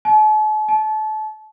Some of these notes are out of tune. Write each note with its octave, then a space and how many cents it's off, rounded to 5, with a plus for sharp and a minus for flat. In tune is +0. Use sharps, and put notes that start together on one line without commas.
A5 -45
A5 -30